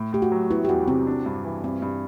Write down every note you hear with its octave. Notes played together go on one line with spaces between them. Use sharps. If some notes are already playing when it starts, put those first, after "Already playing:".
Already playing: A2
A2 G4
F#4
F#3
B3 E4
G4
E2 F#4
C3 C4
D4
G2
E3
G2 C4
G2